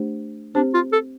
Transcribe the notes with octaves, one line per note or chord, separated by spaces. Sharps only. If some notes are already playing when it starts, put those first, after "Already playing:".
Already playing: A3 D4 G4 C5
C4 D4 G4 C5
F4
A4